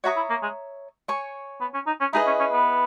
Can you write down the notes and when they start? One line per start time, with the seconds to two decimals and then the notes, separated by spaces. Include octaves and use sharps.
0.04 F#4 C#5 E5 A#5 D#6
0.16 E4
0.30 A#3
0.43 G#3
1.08 C#5 G#5 C#6
1.61 B3
1.74 C#4
1.87 D#4
2.00 C#4
2.13 D#4 E4 G#4 B4 D#5
2.26 C#4
2.40 C#4
2.53 B3